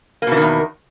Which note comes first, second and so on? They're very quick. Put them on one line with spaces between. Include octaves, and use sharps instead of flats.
A#3 B2 E3 D#3 E2